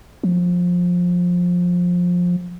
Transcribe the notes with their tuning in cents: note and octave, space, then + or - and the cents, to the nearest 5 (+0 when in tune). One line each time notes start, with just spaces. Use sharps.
F3 +20